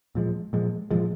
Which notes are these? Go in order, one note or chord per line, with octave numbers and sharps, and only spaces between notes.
A#2 F3 G#3
A#2 F3 G#3
A#2 F3 G#3